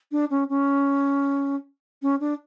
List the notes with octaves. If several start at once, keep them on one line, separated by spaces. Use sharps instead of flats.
D4
C#4
C#4
C#4
D4